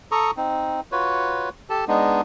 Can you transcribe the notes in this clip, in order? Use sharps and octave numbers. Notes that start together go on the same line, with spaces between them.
A4 A#5 C#6 D#6
C4 D#4
F4 F#4 B4 C#5
G4 A4 A5
G#3 B3 D4 D#4